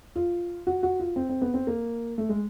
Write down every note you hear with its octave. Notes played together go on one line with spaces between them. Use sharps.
F4
F#4
F#4
F4
C4
C4
B3
C4
A#3
A3
G#3